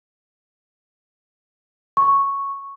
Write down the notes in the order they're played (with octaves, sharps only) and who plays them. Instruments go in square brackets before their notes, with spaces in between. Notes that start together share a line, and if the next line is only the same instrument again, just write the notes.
[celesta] C#6